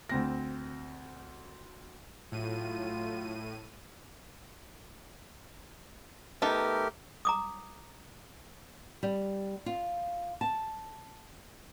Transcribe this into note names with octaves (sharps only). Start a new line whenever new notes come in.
D2 C4 A#6
A2 F#3 F4 D#7
A3 B3 D#4 G4 A#4 A5
A#5 D6 D#6
G3
F4
A5